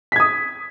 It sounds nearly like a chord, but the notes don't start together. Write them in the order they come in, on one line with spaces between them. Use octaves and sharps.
B6 G#6 D#6